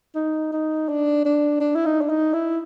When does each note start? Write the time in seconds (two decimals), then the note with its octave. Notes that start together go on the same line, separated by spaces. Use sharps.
0.15 D#4
0.52 D#4
0.88 D4
1.25 D4
1.61 D4
1.75 E4
1.86 D#4
2.01 D4
2.09 D#4
2.34 E4